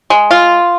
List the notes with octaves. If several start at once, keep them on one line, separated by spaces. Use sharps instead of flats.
G#3
F4